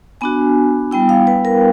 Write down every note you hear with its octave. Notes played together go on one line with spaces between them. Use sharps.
B3 D4 F#4 G#5
G3 B3 E4 G5
F5
B4
A#4